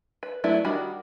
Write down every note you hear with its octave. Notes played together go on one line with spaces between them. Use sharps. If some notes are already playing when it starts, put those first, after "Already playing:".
B4
F#3 A3 B3 D4 E4
D#3 G3 D4 F#4 B5